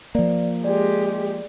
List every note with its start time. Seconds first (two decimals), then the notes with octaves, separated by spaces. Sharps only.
0.15 F3 A#3 D5
0.64 G#3 G4 D5